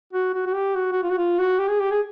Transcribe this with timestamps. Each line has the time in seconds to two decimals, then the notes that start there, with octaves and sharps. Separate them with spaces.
0.13 F#4
0.34 F#4
0.46 F#4
0.55 G4
0.75 F#4
0.92 F#4
1.03 F4
1.10 F#4
1.18 F4
1.39 F#4
1.59 G4
1.69 G#4
1.80 G4
1.91 G#4